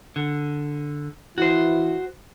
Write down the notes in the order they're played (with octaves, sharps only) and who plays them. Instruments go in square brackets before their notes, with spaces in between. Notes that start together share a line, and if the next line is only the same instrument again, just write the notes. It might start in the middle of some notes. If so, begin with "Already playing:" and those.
[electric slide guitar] D3
[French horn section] E3 E4 [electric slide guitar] F#4 C5